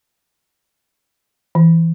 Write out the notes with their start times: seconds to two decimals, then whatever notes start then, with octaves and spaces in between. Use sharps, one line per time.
1.55 E3